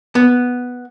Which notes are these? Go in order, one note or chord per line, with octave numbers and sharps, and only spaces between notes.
B3